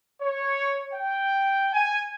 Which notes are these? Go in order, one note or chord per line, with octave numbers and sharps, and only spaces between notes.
C#5
G5
G#5